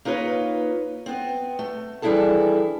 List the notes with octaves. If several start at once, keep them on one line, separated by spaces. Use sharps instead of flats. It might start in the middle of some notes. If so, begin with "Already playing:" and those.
A#3 D#4 F4 B4 C#5
B3 C4
A3
E3 G3 D4 E4 G#4 A4